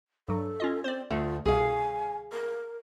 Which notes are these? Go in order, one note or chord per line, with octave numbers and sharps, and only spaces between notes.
G2 F#3 A4
C#4 F4 D#5
C4 C5 D5
D2 A3 F4
C2 B2 G#4 F5 G#5
A#4